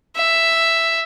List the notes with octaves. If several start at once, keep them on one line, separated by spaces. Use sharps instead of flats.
E5